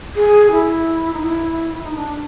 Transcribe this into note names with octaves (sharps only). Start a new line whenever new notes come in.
G#4
E4
D#4
E4
D#4
D4